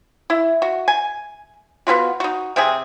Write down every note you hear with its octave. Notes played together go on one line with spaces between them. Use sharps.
E4
F#4
G#5
B3 C#4 F4 F#4
D#4 F#4
C3 C4 G#4